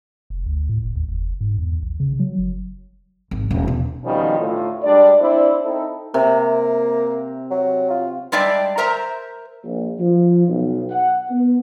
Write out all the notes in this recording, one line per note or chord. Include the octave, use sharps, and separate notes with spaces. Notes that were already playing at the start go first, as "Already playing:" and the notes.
F1
D2
A2
F#1
D#2
F1
G#2
E2
A#1
C#3
F#3
F#1
G#1
D#1
B2
F2 B2 D#3 F3 G3 C#4
D2 A2 F4
G3 G#3 D4 D5
C4 D4 E4 C5 D5
C4 D#4 E4 A4
C3 A#3
F#3
F4
G3 G#3 D4 D5 E5 G5
A#4 C5 E5 A#5
A#1
F3
B1
F#5
B3